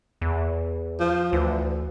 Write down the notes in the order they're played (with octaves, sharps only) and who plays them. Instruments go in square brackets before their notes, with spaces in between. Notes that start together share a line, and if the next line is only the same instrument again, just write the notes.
[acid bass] E2
[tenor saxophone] F3
[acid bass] D2 [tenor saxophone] E3